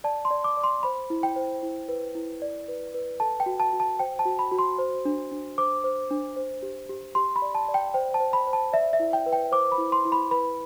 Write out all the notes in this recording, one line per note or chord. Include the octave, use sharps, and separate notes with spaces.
D5 A5
C6
D5
D6
D5
C6
C5 B5
E4
G5
C5
E4
B4
E4
D5
B4
B4
A4 A5
G5
F#4
A5
F#4
A5
C5 G5
A5
F#4
B5
F#4
C6
C5
D4
D4
C5 D6
C5
D4
C5
G4
G4
G4 C6
B5
D5
A5
D5
G5
C5 G5
A5
C5
B5
C5
A5
D5 E5
E5
E4
G5
B4
G5
C5 D6
B5
E4
C6
E4
B5
B4 B5